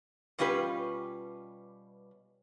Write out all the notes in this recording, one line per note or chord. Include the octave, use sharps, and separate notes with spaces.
B2 G3 C#4 F4 G4 B4